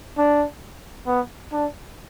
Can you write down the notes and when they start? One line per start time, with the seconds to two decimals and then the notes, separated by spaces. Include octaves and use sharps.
0.18 D4
1.07 B3
1.52 D4